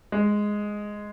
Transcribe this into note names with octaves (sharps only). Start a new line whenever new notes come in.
G#3